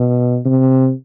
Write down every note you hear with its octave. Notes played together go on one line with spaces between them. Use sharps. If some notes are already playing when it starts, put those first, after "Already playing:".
Already playing: B2
C3